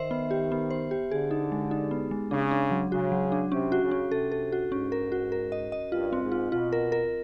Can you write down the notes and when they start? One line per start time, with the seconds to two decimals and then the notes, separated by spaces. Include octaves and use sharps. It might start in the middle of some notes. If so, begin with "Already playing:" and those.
Already playing: D#3 C5 E5
0.11 B3
0.31 G4
0.52 B3
0.70 C5
0.91 G4
1.11 D3 G#4
1.31 D#4
1.52 G#3
1.71 D#4
1.91 B3
2.11 G#3
2.31 C#3 D4
2.51 D4
2.71 F#3
2.91 C#3 F#4
3.12 F#3
3.32 D4
3.52 C3 C#4
3.72 F#4
3.82 C#3
3.91 C#4
4.11 C3 A4
4.32 A4
4.52 F#4
4.72 G#2 C#4
4.92 A#4
5.12 F#4
5.32 A#4
5.52 D#5
5.72 D#5
5.92 G2 F4
6.13 C4
6.22 G#2
6.32 F4
6.52 B2 F4
6.72 A#4
6.92 A#4